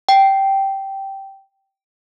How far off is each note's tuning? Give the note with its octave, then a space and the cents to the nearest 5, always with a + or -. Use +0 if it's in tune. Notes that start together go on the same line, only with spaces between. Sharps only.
G5 -10